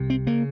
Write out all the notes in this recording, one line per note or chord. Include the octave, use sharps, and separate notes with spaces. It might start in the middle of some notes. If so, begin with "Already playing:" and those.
Already playing: C2 C3
C4
C#3 A#3